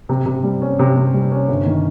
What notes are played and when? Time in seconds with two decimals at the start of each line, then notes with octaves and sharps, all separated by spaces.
0.09 C3
0.26 C3
0.43 G3
0.62 C#4
0.79 C3
0.96 C3
1.14 G3
1.32 C#4
1.49 G1
1.66 D#3